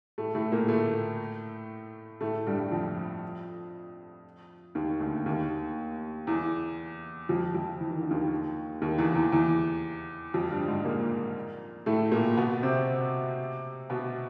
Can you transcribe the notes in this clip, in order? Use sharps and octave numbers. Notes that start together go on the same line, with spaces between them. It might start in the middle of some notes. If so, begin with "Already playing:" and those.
A2 A3
A2 A3
A#2 A#3
A2 A3
A2 A3
G2 G3
F2 F3
D#2 D#3
D2 D3
D#2 D#3
E2 E3
F2 F3
F2 F3
E3
D#3
D3
D#2 D#3
D#2 D#3
E2 E3
E2 E3
E2 E3
F2 F3
G2 G3
G#2 G#3
A#2 A#3
A2 A3
A#2 A#3
B2 B3
C3 C4
B2 B3